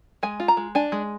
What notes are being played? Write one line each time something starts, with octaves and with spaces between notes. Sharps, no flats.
G#3 G#5
F4
A#5
G#3
D4 G#5
G#3